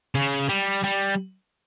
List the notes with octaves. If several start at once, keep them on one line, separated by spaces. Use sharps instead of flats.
C#3
G3
G3